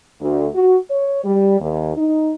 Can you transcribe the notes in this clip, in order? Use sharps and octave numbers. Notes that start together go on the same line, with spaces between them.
D2
F#4
C#5
G3
D#2
D#4